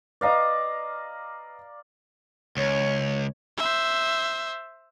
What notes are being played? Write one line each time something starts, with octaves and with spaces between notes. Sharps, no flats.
B4 D5 D#5 F5 A#5
C#2 C#5
C5 E5